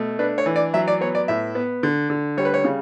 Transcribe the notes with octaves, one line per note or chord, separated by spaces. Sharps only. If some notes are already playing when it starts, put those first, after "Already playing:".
Already playing: B2 A3
D4 B4
C#5
E3
D5
F#3 E5
D5
B3 C#5
D5
A2 E5
B3
D3
D3
G3 C#5
B4
C#5
C#3